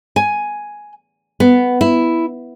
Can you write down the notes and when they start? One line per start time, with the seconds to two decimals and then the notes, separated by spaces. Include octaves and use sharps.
0.16 G#5
1.40 B3
1.81 E4